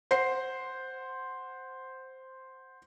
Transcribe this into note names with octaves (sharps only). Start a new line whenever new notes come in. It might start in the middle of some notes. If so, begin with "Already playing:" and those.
C5 F#5 C7